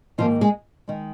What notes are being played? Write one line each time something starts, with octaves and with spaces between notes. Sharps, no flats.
G#2 D#3 F3 A#3 F4
G#3 G#4
D#3 G#3